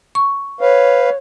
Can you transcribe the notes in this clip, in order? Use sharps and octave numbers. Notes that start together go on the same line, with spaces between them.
C#6
B4 C#5 F5